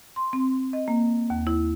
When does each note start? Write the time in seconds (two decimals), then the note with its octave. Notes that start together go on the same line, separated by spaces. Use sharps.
0.16 C6
0.33 C4
0.73 D#5
0.88 A#3
1.30 D#2
1.47 E4